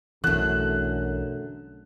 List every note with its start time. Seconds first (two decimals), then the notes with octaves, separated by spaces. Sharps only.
0.24 B1 F#2 D3 E3 A3 F#6